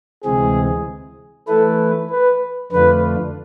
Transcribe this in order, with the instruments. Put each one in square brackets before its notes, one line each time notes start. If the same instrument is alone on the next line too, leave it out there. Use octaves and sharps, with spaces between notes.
[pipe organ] D2 C3 E3 G#3 C4 [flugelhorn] G#4
[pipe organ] E3 A3 E4 B4 [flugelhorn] A4
[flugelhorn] B4
[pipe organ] F2 D3 A3 D4 F4 [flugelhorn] B4